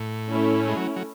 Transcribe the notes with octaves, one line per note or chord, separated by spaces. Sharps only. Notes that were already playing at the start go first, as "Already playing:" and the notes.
Already playing: A2
A3 C#4 E4
G#3
F#3
F#3